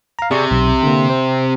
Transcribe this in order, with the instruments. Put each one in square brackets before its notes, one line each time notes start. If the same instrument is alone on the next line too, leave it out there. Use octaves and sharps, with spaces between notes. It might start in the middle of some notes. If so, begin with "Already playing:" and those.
[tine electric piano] F5 A#5
[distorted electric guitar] C3 [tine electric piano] G#4 D5 C#6
[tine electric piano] B1
D3 A#3
C5